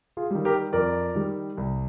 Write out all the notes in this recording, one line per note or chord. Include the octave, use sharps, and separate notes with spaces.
F4 G#4
D#3 G3
G4 A#4
F2 A#4 D5
D#3 G3
C2